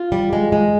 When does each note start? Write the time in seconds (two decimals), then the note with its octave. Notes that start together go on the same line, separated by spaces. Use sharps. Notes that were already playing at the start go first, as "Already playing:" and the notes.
Already playing: F4
0.12 G3
0.33 G#3
0.52 G#3